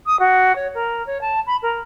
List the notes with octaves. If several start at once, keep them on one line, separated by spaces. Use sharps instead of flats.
D#6
F#4
C#5
A#4
C#5
A5
B5
A#4